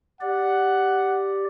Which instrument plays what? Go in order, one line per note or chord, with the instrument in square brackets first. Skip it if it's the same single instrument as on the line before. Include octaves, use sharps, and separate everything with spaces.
[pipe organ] G4 D5 [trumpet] F#5